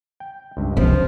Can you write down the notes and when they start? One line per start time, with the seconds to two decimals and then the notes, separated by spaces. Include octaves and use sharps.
0.20 G5
0.57 C#2 G2
0.77 C2 C3 F3 C#4 D4